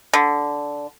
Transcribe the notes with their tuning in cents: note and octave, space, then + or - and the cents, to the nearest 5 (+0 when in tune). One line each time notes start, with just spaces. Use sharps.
D3 -10